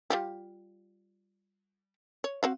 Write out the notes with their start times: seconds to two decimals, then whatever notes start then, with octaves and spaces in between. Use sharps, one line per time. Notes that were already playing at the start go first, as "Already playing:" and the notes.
0.10 G3 F4 G4
2.24 C#5
2.43 C4 F#4 F5